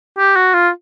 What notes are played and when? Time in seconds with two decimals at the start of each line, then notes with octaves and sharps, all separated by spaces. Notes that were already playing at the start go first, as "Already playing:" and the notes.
0.18 G4
0.36 F#4
0.54 F4